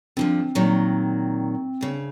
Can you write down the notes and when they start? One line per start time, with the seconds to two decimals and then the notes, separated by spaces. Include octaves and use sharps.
0.17 D3 E3 F3 C4
0.55 A#2 D#3 F#3
1.81 D2 C#3